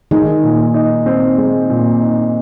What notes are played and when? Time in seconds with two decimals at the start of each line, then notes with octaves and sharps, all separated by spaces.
0.11 D#3 G#3
0.43 A#2
0.74 D#4
1.06 C4
1.38 G#3
1.70 A#2
2.01 D#4